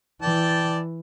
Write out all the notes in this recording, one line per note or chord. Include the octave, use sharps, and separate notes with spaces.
E3 D5 G5 A5